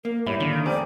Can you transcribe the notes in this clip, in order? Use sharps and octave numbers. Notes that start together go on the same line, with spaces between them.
A#3 A#4
G#2 G3 E4 C#5 B5
D3 D#3 A#3
D7
F1 G4 C5 D5 D#7